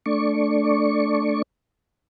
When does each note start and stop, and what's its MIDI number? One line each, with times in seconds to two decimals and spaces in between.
0.06 1.42 57
0.06 1.42 62
0.06 1.42 74
0.06 1.42 85